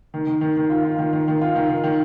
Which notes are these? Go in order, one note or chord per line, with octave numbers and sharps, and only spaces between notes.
D#3
D#3
D#3
D#3
F4
F4
D#3
D#3
D#3
F4
D#3
D#3
D#3